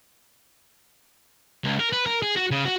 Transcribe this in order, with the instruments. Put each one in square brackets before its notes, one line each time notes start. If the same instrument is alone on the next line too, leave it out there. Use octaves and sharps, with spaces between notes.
[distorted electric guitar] C#2
A#4
B4
A#4
G#4
F#4
C#3
F#4